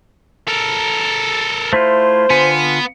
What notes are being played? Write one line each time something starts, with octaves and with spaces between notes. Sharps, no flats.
A4 A#4
A3 E4 F4 C5
D3 B3 F4 G#5